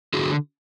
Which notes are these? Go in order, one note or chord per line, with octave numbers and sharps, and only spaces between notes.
D3 F#4 G#4